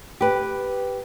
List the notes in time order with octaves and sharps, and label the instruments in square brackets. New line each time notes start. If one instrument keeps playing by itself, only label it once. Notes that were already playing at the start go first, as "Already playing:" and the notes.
[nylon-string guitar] G4 B4